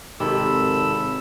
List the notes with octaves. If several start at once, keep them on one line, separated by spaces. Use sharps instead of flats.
G#1 C3 D#3 A4 B5 E6